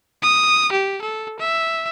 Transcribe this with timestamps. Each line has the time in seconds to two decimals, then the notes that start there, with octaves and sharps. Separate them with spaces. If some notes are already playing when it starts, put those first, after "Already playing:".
0.22 D#6
0.72 G4
1.01 A4
1.39 E5